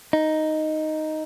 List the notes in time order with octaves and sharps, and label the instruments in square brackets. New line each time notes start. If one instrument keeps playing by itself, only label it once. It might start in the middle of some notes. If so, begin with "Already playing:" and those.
[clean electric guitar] D#4